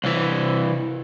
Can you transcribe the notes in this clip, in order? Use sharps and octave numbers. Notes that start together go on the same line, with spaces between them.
C2 E3